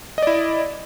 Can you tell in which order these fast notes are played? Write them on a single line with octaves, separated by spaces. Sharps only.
D#5 D5 E4